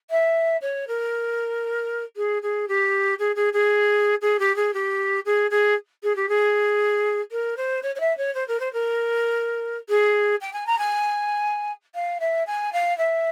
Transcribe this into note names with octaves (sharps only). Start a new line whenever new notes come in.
E5
C#5
A#4
G#4
G#4
G4
G#4
G#4
G#4
G#4
G4
G#4
G4
G#4
G#4
G#4
G4
G#4
A#4
C5
C#5
C#5
E5
C#5
C5
A#4
C5
A#4
G#4
G5
G#5
A#5
G#5
F5
E5
G#5
F5
E5